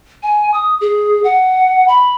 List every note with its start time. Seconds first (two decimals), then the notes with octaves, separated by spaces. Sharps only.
0.23 G#5
0.54 D#6
0.81 G#4
1.24 F#5
1.88 B5